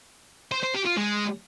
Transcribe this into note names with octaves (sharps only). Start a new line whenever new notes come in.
C5
C5
G4
F4
G#3